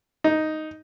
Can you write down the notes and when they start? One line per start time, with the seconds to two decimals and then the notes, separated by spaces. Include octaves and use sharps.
0.24 D#4